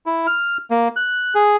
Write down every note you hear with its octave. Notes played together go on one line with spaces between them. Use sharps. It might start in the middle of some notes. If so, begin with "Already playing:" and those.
E4
F6
A#3
F#6
G#4